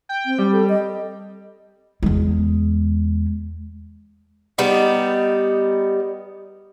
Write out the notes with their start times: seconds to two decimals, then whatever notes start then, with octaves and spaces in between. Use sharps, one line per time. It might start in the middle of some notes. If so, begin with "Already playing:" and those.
0.09 G5
0.26 C4
0.39 G3
0.53 A4
0.69 D#5
2.03 E2 G#3
4.58 G3 B3 D#4